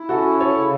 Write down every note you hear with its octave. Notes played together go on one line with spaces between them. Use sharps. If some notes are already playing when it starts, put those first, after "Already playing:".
Already playing: E4
C#4 F#4 A4
A4 C#5
C#3